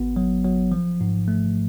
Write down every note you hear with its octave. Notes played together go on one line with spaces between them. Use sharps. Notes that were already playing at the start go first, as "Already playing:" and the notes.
Already playing: G#1 B3
F#3
F#3
F3
G#2
A3